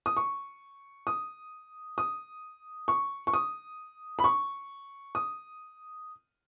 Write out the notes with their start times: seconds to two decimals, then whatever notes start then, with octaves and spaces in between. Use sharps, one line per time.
0.06 D#6
0.17 C#6
1.07 D#6
1.98 D#6
2.88 C#6
3.27 C#6
3.34 D#6
4.19 B5
4.24 C#6
5.15 D#6